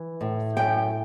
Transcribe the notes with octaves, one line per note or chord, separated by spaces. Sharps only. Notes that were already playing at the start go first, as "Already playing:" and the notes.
Already playing: E3
A2
F#2 G5